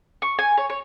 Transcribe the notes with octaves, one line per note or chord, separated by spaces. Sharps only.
C#6
G#5
C#5
C#5